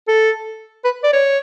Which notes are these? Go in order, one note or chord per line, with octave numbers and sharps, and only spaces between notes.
A4
B4
D5
C#5